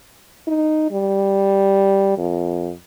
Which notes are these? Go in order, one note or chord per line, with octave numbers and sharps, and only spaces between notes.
D#4
G3
F2